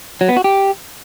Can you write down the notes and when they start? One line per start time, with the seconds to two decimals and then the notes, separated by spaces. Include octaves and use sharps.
0.21 F#3
0.29 B3
0.37 F#4
0.44 G4